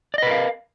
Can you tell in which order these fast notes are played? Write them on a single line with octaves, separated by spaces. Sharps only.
D5 D#5 B4 A#4 F5